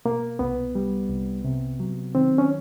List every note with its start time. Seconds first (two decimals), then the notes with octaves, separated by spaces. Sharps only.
0.05 B2 A#3
0.39 C2 B3
0.75 G3
1.10 C2
1.45 C3
1.80 F#3
2.15 D#3 C4
2.38 C#4